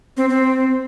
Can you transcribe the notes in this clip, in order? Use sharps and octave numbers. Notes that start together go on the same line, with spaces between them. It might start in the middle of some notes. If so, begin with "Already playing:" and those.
C4
C4